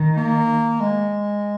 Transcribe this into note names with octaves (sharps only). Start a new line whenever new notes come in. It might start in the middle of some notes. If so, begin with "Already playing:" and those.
Already playing: D#3
A#3
G#3